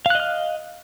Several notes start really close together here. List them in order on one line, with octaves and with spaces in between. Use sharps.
F5 F#6 D#5 F6